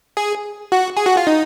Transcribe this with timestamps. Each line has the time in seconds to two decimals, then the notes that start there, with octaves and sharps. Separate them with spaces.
0.17 G#4
0.72 F#4
0.97 G#4
1.06 F#4
1.17 F4
1.27 D#4